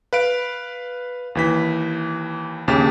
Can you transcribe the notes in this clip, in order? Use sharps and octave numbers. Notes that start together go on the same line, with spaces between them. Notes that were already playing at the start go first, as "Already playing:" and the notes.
B4 F5 D7
D#2 E3 B6
A#1 D#2 C#3 G4 A6